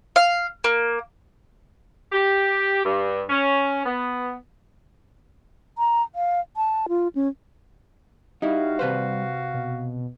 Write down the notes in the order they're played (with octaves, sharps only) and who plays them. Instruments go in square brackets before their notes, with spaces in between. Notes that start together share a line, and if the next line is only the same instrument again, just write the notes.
[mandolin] F5
A#3
[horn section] G4
G2
C#4
B3
[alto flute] A#5
F5
A5
F4
C#4
[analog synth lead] G3 [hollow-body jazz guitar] D#4 E4 [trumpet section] F#4 F5
[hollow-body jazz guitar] C3 B4 C5
[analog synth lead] B2